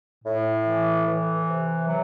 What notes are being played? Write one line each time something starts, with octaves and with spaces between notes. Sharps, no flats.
A2
E3
E3
C3
F#3